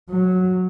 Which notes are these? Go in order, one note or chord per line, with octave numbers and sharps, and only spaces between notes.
F#3